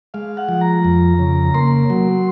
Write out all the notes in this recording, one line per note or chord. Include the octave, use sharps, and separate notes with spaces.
G#3 F5
F#5
F3
A#5
F2
C#3
A#3 C6
F#3